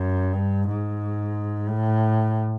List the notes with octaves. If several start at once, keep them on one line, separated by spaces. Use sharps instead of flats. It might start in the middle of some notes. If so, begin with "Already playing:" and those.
Already playing: F#2
G2
G#2
A2